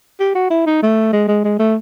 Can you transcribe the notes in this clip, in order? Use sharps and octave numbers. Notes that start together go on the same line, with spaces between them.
G4
F#4
E4
D#4
A3
G#3
G#3
G#3
A3